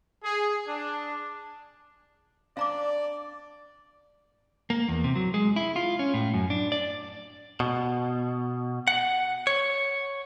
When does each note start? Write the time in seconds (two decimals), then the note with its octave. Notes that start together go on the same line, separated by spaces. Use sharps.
0.24 G#4
0.68 D4
2.57 D4 D5 F5 A#5 D6
4.70 A#3
4.88 E2
5.04 C3
5.16 F#3
5.34 G#3
5.56 E4
5.76 F4
5.99 C#4
6.14 A2
6.34 F#2
6.50 D4
6.72 D5
7.60 B2
8.88 F#5
9.47 C#5